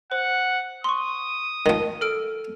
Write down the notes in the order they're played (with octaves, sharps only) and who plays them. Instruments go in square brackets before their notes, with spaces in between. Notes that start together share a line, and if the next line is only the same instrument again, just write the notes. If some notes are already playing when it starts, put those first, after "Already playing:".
[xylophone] C5 [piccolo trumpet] F#5
[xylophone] C6 C#6 [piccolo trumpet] D#6
[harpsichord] D#3 F3
[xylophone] A4 F6 D7